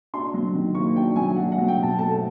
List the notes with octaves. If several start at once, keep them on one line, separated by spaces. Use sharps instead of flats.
D4 C6
F#3
D#3
A#3 C#6
D4 G5
F#3 G#5
D4 F#5
F#5
F#3
G5
B2 A5
A3 A5